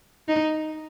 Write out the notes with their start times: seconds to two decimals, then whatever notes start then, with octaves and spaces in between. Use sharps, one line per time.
0.29 D#4